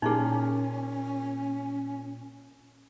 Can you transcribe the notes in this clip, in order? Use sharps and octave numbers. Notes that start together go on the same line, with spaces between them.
A#2 A#3 C#4 D#4 E4 G#4